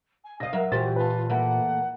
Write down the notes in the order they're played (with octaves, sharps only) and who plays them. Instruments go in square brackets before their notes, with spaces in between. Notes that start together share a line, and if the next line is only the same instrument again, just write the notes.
[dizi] G#5
[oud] C3 D#5 [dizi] F5 [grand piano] A#6
[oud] F#3 A#4 E5
[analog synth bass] A#2 [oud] E3 G4 C5 [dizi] F#4 [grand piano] A6
[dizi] F4 [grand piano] B4 A5
[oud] E3 A3 A#3 [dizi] F#5